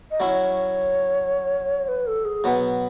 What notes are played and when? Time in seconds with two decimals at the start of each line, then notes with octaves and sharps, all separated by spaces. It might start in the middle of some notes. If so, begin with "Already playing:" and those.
0.11 D#5
0.20 F#3 C#4 E4 C#5
1.88 B4
2.07 A4
2.25 G#4
2.44 B2 F#3 B3